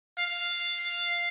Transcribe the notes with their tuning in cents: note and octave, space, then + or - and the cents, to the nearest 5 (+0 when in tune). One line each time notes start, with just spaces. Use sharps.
F5 +0